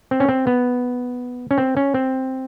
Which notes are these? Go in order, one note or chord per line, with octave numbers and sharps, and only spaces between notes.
C4
C#4
C4
B3
C#4
C4
C#4
C4